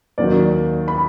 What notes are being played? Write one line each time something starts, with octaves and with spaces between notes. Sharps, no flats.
D#2 D#3 F#3 D5
B5